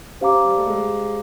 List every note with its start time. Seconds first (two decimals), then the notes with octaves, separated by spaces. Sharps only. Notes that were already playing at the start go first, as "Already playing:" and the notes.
0.21 C#4 G4 C5 F5 A#5 D6
0.44 G3
0.58 A3
0.67 G#3